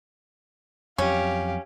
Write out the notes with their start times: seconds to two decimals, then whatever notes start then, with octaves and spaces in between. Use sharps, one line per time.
0.98 F2 F#3 C#4 G4 F5